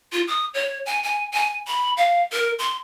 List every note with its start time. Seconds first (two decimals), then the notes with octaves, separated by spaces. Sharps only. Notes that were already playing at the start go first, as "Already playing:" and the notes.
0.12 F4
0.27 D#6
0.54 C#5
0.86 G#5
1.03 G#5
1.33 G#5
1.67 B5
1.97 F5
2.33 A#4
2.59 C6